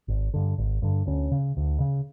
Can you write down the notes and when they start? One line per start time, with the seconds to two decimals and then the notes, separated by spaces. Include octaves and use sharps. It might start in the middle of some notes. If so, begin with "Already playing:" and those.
0.08 G#1
0.34 G2 D3
0.58 G#1
0.82 G2 D3
1.07 D2 C#4
1.32 C#3
1.57 D2
1.80 C#3